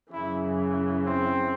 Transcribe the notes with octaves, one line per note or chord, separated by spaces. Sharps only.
F#2 C#3 E3 E4
C4